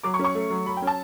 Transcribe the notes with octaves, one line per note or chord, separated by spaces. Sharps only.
F#3 D6
C#6
C#4
C#6
A3
F#3
F#3 B5
G5
C#4
A5